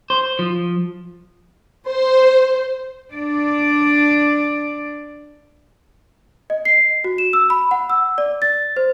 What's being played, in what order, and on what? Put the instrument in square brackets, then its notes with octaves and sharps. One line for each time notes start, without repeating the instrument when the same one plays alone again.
[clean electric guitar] C5
F3
[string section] C5
[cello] D4 D5
[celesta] D#5
C7
F#4
E7
E6
B5
F#5
E6
D5
A6
C5